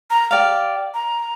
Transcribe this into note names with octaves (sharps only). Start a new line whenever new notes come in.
A#5
G4 D5 F5
A#5